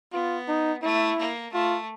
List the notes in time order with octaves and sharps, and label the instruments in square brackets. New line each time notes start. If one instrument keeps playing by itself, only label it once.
[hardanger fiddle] B3 [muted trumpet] F4
[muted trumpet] D#4
[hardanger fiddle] A3 [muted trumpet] E4
[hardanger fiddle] A#3
[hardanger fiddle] A3 [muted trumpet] F4